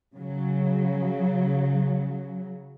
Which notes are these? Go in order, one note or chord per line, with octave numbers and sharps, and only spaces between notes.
C#3 F#3